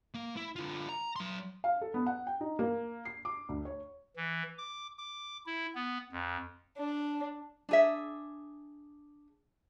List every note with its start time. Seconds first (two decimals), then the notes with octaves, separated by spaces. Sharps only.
0.14 A#3
0.37 E4
0.56 D3 F4
0.89 A#5
1.16 F#3 C6
1.64 F5
1.81 A4
1.94 B3
2.07 F#5
2.27 G5
2.41 D#4
2.59 A#3
3.05 C7
3.25 D6
3.49 D2
3.65 C#5
4.16 E3
4.58 D6
4.98 D6
5.46 E4
5.75 B3
6.12 F2
6.77 D4
7.69 D4 G#4 E5